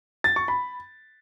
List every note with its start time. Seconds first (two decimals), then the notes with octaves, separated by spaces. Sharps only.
0.24 A6
0.36 C#6
0.48 B5